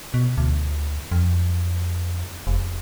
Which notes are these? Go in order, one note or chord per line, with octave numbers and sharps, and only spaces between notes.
B2
D2
F2
F1